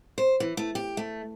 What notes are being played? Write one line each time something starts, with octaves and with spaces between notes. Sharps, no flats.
C5
E3
A3
G4
A3